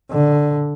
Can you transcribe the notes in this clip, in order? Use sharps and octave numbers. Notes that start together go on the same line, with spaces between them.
D3